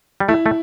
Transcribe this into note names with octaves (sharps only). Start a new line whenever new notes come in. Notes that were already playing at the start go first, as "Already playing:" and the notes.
G3
A3 E4
A3